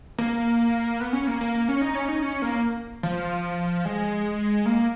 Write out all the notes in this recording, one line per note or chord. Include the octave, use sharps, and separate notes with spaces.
A#3
B3
C#4
A#3
A#3
A#3
C#4
D#4
C#4
D#4
C#4
A#3
F3
G#3
A#3